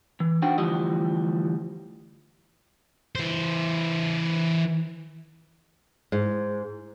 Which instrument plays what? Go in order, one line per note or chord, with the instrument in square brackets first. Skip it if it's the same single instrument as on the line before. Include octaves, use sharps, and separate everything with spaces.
[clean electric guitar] E3
D4 D#4 F#4 C5 G5
D2 E3 F3 G3 G4 D#5
[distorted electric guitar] E3 C5
[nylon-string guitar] G#2